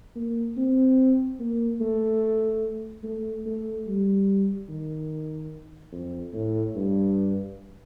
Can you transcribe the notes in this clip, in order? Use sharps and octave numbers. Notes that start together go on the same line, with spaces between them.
A#3
C4
A#3
A3
A3
A3
G3
D#3
F2
A2
G2